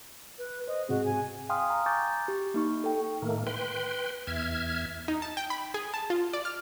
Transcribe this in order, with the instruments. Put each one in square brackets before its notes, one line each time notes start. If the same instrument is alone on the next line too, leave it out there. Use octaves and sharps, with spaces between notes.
[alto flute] B4
[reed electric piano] C5 [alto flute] D#5
[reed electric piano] G#2 C3 C4 [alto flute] F#4 [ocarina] G#4
[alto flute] G#5
[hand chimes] F5 G5 G#5 C6 D#6 F6
A#5
G#5 A#5 C#6 D6 G6 A6
G4
A#3 D#4 C#6
A4 G5
[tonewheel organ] A2 D#3 A3 A#3
B4 G5 C6
E2 E5 F6 G#6
[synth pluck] D#4
A5
G5
B5
G#4
A5
F4
D5
F6